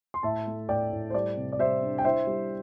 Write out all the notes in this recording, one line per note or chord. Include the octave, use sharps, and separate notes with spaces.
C6
A2 E5 A5
A3
A2 D5 G5
A2
C5
G3 D5
C3
D5
G3 C5 E5
D4
G5
E4 C5 E5
G3